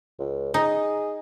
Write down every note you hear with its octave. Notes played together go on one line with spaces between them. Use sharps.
C#2
D#4 G#4